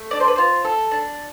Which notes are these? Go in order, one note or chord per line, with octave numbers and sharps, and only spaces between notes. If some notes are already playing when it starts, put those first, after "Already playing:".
Already playing: A3
D4 D5
C5
B4
F4 C5
A4
D4